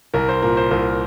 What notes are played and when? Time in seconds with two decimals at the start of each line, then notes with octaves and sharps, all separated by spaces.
0.14 C2 A#4
0.29 C5
0.42 A#2 A#4
0.57 C5
0.71 C2 A#4